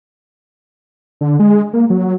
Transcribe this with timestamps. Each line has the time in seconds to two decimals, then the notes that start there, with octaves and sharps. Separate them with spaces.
1.21 D3
1.40 G#3
1.73 A#3
1.90 F#3